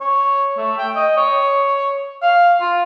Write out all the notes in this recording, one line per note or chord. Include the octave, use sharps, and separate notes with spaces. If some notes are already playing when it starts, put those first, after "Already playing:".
C#5
A3
G5
D#5
C#5
F5
F4